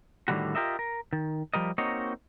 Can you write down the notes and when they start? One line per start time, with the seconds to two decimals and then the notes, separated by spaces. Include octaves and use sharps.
0.28 A2 D3 D#3 G3 G#3 F#4
0.55 F4 G4 A#4 D#5 E5
0.79 A#4
1.13 D#3
1.54 F3 G3 A#4 D#5
1.78 A#3 C4 D#4 F#4 C#5 D#5